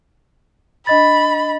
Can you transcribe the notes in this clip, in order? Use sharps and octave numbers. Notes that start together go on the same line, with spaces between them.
D4 D#5 B5 A6